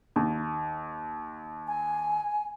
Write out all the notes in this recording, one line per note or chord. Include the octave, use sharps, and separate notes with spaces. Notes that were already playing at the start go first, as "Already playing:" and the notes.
D#2
G#5